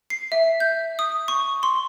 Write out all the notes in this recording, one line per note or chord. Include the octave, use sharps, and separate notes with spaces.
C7
E5
G6
D#6
C#6
C6